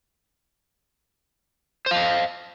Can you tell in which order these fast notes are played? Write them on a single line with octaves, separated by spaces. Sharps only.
C5 F5 D#5